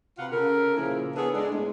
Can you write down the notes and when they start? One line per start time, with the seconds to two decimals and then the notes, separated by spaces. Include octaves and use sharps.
0.18 C3 F4 B4 F#5
0.31 C#3 C#4 A4 A#4
0.77 A#2 C#3 F3 A#3 E4 G#4
1.15 B3 D4 G#4 A4 B4 C#5
1.34 G#3 D4
1.51 A2 G#3